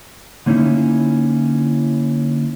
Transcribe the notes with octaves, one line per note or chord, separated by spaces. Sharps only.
D3 A#3 C#4 D#4 E4